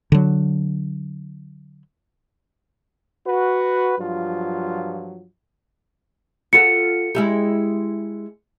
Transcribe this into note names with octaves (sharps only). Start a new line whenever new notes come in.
D3 F#3
F#4 B4
G2 F3 F#3 F4
F4 F#4 A4 C#7
G#3 E4 G4